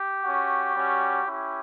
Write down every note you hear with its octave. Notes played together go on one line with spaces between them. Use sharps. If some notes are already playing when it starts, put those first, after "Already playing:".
Already playing: G4
C#4 F#4
G3 C#4 F#4
C#4 E4 G4